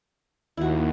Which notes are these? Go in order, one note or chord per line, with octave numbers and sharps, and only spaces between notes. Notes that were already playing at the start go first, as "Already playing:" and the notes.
D#2 E4 F#4